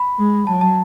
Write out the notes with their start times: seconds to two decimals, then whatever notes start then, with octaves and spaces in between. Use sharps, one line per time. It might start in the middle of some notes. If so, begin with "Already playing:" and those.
Already playing: B5
0.19 G#3
0.47 F#3 A5
0.61 A5